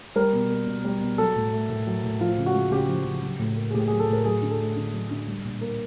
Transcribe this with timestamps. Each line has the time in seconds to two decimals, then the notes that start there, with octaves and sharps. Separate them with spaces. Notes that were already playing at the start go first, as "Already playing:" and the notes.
0.16 G3 A#4
0.33 B2
0.50 A#3
0.67 B2
0.85 G3
1.01 B2
1.18 F#3 A4
1.36 A2
1.52 A3
1.70 A2
1.87 F#3
2.04 A2
2.20 F3 F4
2.38 C#3
2.46 F#4
2.55 G#3
2.72 C#3 G4
2.88 F3
3.06 C#3
3.23 F#3
3.39 A2
3.57 A#3
3.70 G#4
3.74 A2 G4
3.87 F#3 G#4
4.00 A4
4.08 A2 A#4
4.25 F#3 G#4
4.42 D3
4.51 A4
4.60 A3
4.76 D3
4.93 F#3
5.11 D3
5.27 G3
5.45 A#2
5.61 A#3